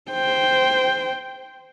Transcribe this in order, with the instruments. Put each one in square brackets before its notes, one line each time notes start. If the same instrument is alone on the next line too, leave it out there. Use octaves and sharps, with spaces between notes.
[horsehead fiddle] C5 G5